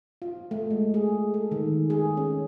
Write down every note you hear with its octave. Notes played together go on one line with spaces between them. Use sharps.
F4
A3
G#3
G#4
A4
D#3
G#4
C#4